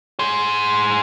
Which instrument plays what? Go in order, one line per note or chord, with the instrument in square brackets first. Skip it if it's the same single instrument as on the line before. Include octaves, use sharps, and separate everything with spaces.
[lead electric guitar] G#4 C5